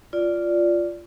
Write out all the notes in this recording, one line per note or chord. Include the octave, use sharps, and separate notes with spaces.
F4 D5